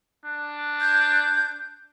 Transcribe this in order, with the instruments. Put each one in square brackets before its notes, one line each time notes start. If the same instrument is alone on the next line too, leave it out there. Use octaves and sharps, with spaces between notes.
[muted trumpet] D4
[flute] G6